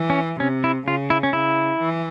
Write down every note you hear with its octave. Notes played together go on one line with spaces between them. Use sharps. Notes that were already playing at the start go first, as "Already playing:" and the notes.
Already playing: E3
C#4
C3 C#4
E4
C#3 F4
E4
C#4
C#3 E4
E3